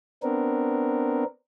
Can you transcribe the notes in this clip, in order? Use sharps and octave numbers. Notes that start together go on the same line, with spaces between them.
B3 C4 D4 A#4